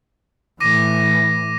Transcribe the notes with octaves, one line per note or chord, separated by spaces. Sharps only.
A2 E3 D6 A#6 D#7